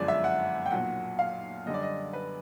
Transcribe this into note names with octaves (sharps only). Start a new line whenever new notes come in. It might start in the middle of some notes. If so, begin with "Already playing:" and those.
Already playing: G1 F#2 D3 F3 G#3 D5
E5
F#5
G5
B1 A#2 F#3 F#5
F5
F#2 D3 G3 D#5
D5
D#5
B4